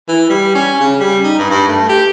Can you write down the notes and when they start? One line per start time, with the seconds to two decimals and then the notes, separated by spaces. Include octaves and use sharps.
0.09 E3
0.30 G3
0.55 C#4
0.80 C#3
1.00 G3
1.24 D#4
1.39 G2
1.50 G2
1.68 A3
1.89 G4